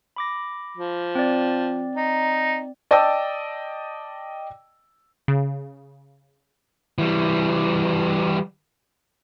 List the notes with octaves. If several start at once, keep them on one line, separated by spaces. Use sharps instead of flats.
B5 D6 A#6
F3
C4 D5
D#4
D5 D#5 G5 A5 D6 E6
C#3
E3 G3